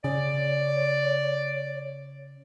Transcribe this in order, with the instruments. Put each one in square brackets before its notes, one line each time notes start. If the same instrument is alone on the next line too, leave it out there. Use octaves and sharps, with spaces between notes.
[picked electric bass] C#3 [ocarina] C#5 [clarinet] D5